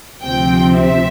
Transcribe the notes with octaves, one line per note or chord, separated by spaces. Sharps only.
D2 C3 F3 C4 G5
E5